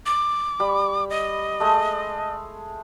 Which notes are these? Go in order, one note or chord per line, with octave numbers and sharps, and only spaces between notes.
D6
G3 B5
D#5
G#3 A3